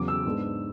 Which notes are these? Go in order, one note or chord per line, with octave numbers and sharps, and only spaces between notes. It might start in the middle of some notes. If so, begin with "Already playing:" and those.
Already playing: E2 C#3 F#3 D6
E6
G#2 G#3 B3 D4